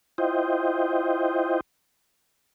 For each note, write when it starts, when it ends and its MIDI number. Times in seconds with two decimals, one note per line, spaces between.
0.18 1.61 64
0.18 1.61 65
0.18 1.61 72
0.18 1.61 75
0.18 1.61 79